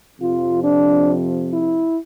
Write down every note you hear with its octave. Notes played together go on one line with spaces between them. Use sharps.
F2 C3 F3 F4
D4
E4